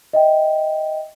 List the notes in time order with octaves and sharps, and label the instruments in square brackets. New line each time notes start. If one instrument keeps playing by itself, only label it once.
[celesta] D#5 E5 G5